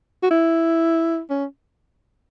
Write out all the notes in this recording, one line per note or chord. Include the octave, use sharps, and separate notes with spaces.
F#4
E4
C#4